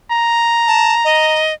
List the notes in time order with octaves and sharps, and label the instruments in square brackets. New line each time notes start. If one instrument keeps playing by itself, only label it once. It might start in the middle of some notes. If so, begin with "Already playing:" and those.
[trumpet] A#5
[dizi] A5
D#5